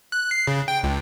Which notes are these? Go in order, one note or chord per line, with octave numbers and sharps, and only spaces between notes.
F#6
C7
C#3
G5
C#2